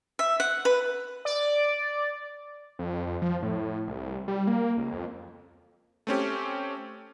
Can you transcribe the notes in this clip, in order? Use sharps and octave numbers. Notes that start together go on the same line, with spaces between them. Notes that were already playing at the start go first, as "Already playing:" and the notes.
E5
F#5
B4
D5
F2
F2
F3
A2
C2
G3
A#3
C#2
F2
A3 C4 C#4 G4